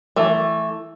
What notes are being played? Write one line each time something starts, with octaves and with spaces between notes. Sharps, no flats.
E3 A3